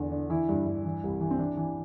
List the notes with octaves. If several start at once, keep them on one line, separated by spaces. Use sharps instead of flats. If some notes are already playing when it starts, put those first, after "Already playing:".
Already playing: E2 D3
D3
E3 E4
G2
G2
E3
C2
E3
C4
E3 D4
E3